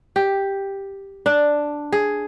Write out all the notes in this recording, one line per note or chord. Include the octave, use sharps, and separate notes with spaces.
G4
D4
G#4